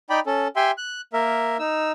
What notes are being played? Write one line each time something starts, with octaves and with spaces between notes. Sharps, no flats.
D#4 D5 G5 B5
C#4 A4
G4 E5 G5 G#5 C6
F#6
A#3 A#4 E5
D#4 E6